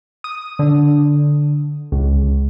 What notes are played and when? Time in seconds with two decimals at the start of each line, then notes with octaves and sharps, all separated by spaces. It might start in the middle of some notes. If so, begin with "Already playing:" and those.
0.24 D#6
0.59 D3
1.92 C#2